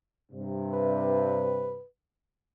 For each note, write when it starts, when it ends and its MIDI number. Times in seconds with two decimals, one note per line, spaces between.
0.32 1.80 43
0.32 1.80 48
0.73 1.85 71